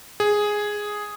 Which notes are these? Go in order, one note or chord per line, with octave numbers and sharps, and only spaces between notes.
G#4